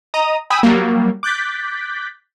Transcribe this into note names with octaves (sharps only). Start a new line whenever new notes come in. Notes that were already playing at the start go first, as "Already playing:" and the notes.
D#5 A#5 D#6
G5 G#5 B5 D#6 E6
F#3 G3 A#3
D6 F#6 G6 A6 B6